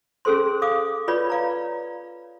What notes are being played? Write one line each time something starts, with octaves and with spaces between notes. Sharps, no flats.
C#4 G#4 A4 C5 C6
F5 D6 D#6
F4 B4 C#5 D5 B5
D5 F5 A#5